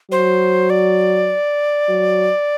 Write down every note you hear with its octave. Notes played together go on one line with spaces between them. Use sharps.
F#3 C5
D5
F#3